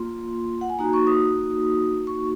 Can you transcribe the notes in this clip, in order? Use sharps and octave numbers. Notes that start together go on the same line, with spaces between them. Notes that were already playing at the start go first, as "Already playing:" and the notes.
Already playing: A#3 F4 C6
F#5
G#5
A#3 D#4 F#4 A#5
C#6
D#6
C#6